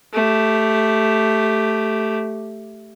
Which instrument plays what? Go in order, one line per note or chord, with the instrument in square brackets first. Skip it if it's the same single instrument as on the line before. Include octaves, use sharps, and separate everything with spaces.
[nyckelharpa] A3 G4